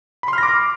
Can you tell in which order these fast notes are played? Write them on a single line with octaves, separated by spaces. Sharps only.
B5 C6 F6 A#6 D6